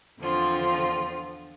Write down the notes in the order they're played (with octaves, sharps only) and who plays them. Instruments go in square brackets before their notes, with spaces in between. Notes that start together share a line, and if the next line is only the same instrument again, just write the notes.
[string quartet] E2 D3 F3 C4 F4